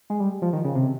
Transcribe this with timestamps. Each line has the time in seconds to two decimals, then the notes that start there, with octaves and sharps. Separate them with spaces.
0.10 G#3
0.20 G3
0.42 F3
0.53 D#3
0.64 C#3
0.75 C3